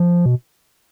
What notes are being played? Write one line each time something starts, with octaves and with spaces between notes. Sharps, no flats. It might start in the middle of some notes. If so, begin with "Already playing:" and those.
Already playing: F3
B2